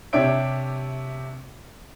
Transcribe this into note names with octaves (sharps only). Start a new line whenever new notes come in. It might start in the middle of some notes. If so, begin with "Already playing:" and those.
C3 D4 G4 C#5 E5 D7